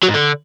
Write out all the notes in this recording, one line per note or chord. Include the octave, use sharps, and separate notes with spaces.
F#3
G#2
D3